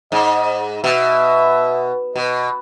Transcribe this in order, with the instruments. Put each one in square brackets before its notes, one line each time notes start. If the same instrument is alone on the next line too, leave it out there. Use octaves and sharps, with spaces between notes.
[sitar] G#2 [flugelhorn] D#5
[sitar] B2 [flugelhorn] E5
[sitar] B2 [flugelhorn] D#5